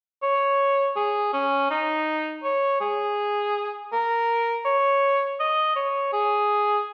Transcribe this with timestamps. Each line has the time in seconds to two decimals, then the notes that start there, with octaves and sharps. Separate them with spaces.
0.23 C#5
0.96 G#4
1.33 C#4
1.71 D#4
2.43 C#5
2.81 G#4
3.92 A#4
4.65 C#5
5.40 D#5
5.76 C#5
6.13 G#4